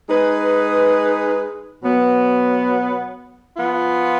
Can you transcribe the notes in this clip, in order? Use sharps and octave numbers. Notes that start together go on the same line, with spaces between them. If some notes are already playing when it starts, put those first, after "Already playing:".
G#3 D#4 G#4 B4
B2 F#3 B3
F3 B3 F4